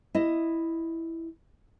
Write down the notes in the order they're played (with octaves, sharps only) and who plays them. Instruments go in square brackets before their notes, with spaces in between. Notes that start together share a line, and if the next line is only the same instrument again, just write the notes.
[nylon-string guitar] E4 D#5